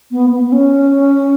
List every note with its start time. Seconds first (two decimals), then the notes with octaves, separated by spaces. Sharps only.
0.11 B3
0.31 B3
0.43 B3
0.52 C#4